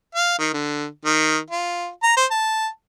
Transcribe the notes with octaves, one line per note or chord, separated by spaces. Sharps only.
F5
D#3
D3
D#3
F4
A#5
C5
A5